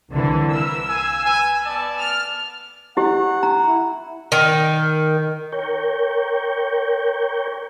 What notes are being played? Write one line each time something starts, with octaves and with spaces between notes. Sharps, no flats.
C2 D3 E3
A#4 B4 E6
F5 G#5
B4 G#5
B3 D5 A5
F6
E4 G4 F#5
A#5
E4
D#3
A#4 C#5 G5